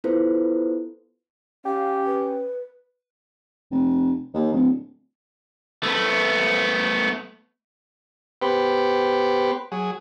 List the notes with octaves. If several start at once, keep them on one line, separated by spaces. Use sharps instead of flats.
B3 E4 F4 A4 B4 C5
C#4 G4 F5
B4
F1
D#2
D1
A3 B3
B3 G4 B4 C5
F#3 G#4